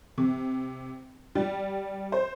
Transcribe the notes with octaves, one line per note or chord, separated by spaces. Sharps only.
C3
G3
C5